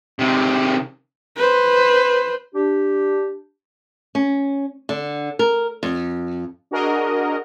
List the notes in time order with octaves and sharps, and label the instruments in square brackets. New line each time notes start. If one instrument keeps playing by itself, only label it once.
[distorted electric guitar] C3 D#3
[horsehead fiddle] B4 C5
[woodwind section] D4 G4
[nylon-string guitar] C#4
D3
A#4
F2
[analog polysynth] D4 F#4 G#4 A#4 D#5